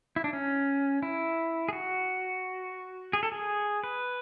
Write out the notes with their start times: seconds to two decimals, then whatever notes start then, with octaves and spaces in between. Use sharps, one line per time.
0.16 E4
0.24 D4
0.33 C#4
1.03 E4
1.69 G#4
1.73 F#4
3.13 G#4
3.23 A4
3.32 G#4
3.84 B4